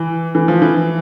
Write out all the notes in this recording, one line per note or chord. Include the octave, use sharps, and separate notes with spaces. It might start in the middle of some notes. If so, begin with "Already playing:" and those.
Already playing: E3
E3
F3
E3